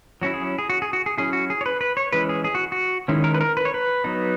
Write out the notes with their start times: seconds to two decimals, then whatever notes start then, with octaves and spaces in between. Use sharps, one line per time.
0.22 F#3 C#4 E4 F#4
0.34 G#4
0.59 G#4
0.70 F#4
0.82 G#4
0.93 F#4
1.06 G#4
1.18 F#3 C#4 E4 G#4
1.33 F#4
1.50 G#4
1.61 C#5
1.66 B4
1.81 B4
1.97 C#5
2.12 E3 G#3 C#4 B4
2.29 G#4
2.44 G#4
2.55 F#4
2.72 F#4
3.08 D#3 G#3 C#4 E4
3.24 A#4
3.34 B4
3.41 A#4
3.57 B4
3.65 C#5
3.74 B4
4.04 F#3 B3 D#4